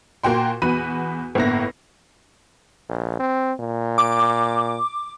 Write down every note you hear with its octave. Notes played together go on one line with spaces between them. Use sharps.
A#2 A#3 F#4 G5 C6
E2 B3 F#4 B5 D#7
G1 A2 A#3 B3 E4 A#6
A#1
C4
A#2
D6